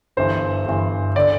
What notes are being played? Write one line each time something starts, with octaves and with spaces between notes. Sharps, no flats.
G1 G2 E3 C5
G1 G2 E3
D3 D5